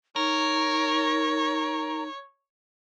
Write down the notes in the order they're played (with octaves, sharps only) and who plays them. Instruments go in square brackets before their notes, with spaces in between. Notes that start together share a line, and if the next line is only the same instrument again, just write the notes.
[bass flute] D#4 [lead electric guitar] A#4 [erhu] C#5